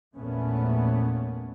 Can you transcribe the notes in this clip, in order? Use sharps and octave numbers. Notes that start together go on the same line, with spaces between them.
A#1 E2 A#2 A3 B3 C#4